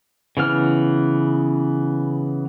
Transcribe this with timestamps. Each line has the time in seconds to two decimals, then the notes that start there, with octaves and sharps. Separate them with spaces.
0.37 C#3 E3 B3 F6